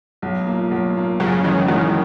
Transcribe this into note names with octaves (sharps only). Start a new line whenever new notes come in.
B1
A#2 A#3
B1
A#2 A#3
F#2 C#3
D#3 E3 G#3
F#2 D#3